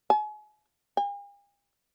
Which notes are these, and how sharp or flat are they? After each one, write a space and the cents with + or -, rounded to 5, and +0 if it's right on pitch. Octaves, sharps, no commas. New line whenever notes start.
G#5 +35
G#5 -45